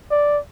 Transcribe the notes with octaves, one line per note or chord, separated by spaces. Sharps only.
D5